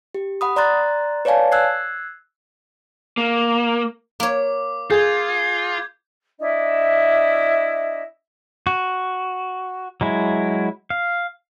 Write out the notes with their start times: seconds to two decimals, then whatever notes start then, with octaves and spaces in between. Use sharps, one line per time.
0.15 G4
0.41 F#5 B5 D#6
0.56 D5 A#5 C6 F#6 A6
1.25 B4 C#5 D5 F5 G#5 A5
1.52 E6 F#6 G#6 C7
3.17 A#3
4.20 A#3 C#5 D6
4.91 F4 G#4 G6 G#6
6.39 D4 E4 D#5 E5
8.67 F#4
10.01 F#3 G#3 E4
10.90 F5